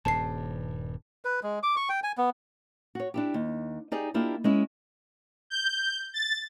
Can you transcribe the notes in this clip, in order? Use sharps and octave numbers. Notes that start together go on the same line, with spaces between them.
D#1 G2 A5 C7
B4
G#3
D6
C#6
G5
G#5
B3
F#4 C#5
D4 E4 G4
D#2
D#4 G4 G#4 D5 D#5
A#3 D4 E4 F4 G4
G#3 C#4 E4
G6
A6